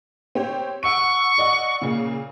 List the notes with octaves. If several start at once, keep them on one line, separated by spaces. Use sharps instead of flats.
C4 G4 C#5
F#5 C#6 E6 D7
D5 D#5 F#5
A#2 C#3 A#3